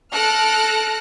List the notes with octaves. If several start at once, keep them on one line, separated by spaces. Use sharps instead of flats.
A4 F6 F#6 A#6 D7